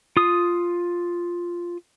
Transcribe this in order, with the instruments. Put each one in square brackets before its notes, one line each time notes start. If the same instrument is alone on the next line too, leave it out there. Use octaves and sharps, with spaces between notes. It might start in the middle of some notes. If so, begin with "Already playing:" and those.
[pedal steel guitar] F4 D#6